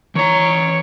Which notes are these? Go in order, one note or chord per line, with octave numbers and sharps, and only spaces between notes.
E3 C#5 A#5